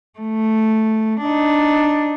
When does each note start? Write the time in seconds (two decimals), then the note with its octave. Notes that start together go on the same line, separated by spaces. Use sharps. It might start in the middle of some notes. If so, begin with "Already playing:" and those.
0.19 A3
1.21 D4 D#4